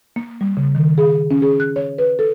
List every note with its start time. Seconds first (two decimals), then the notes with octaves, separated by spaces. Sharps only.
0.16 A#3
0.41 G3
0.57 C#3
0.75 D#3
0.98 G#4
1.31 C#4
1.42 G#4
1.60 F#6
1.76 C#5
1.98 B4
2.19 A4